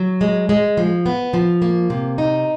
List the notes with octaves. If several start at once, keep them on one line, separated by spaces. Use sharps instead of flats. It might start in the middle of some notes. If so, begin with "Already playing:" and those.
Already playing: F#3
G#3
G#3
F3
B3
F3
A#3
C3
D#4